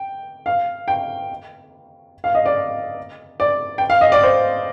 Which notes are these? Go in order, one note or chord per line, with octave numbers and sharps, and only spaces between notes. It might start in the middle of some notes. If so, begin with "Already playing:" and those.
Already playing: G5
F5
G5
F5
D#5
D5
D5
G5
F5
D#5
D5
C5